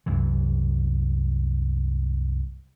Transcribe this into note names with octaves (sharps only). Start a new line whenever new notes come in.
C2 F#2 E3